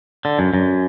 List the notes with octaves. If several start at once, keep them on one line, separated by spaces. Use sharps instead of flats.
D3
F#2
F#2